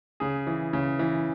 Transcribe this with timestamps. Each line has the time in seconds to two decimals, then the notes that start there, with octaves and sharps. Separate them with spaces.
0.20 C#3 G#4
0.47 E3
0.73 C#3
0.99 E3